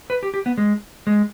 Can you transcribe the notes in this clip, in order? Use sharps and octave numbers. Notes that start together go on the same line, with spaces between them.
B4
G4
G4
B3
G#3
G#3